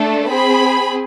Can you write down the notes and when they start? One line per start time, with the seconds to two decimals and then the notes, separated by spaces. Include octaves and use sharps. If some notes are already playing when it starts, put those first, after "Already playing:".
Already playing: A3 D4 A4
0.30 C4 G#4 B5